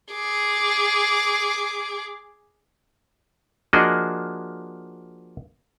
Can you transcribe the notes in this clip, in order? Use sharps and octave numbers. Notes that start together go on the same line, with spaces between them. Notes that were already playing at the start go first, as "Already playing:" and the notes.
G#4 D6
F3 A#3 D4 F#4 G#4 D#5